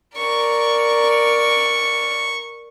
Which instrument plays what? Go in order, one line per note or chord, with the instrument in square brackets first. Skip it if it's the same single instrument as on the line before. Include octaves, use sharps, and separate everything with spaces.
[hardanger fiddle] A#4 D5 [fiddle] C#6